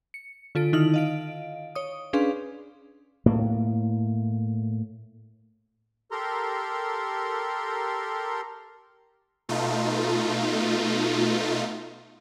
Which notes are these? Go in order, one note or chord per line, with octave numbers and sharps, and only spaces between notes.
C#7
D3 F4 A4 D7
D#3 D#4 E4 F6 F#7
D#5 F5 D7
C#5 D#6
C#4 D4 G#4 B4 F5 C6
A2 A#3
G4 A4 A#4 A#5 C6
B2 A3 D#4 F4